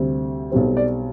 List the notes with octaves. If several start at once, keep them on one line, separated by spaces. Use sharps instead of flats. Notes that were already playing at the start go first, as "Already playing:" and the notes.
Already playing: D2 C3 G3 C4
B1 B2 G3 C4
D5